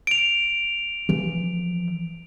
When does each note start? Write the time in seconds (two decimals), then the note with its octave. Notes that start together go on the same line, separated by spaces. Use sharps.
0.07 D7 F7
1.09 E3 F3